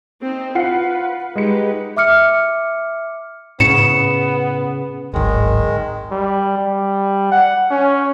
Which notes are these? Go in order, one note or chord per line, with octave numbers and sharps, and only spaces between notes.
C4 D#4
F4 B4 F#5 C7
G#3 D#4 G4 B4 C#7
E5 D6 F6 C#7
A2 C#3 B3 C#7 E7
D1 G#1 D#3 G#3
G3
G3
F#5
C#4